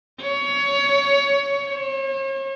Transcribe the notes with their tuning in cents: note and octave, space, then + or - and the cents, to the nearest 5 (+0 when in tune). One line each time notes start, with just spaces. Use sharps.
C#5 +20
C#5 -40